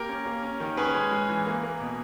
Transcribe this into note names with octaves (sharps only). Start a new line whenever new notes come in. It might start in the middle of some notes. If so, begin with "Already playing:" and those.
Already playing: A#3 G4 A#4
C#4
A#3
C#4
D#3
C#4 G#4 B4
G#3
G#3
E3
A#3
A#3
B2